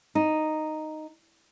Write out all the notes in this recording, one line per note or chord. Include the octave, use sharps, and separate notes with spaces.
D#4